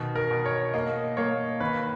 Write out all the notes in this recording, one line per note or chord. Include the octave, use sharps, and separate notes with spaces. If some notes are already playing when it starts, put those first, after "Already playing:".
Already playing: B2 D#3
A#4
B2
C#5
A#3 D#5
A#3 C#5
D#2 B4